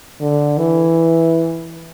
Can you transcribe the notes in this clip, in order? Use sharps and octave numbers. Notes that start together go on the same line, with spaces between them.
D3
E3